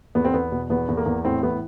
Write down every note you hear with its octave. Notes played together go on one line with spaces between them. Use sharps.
E2 B3
C4
E2 B3
B2
E2 B3
E2
A#3
E2
A2 C4
E3 B3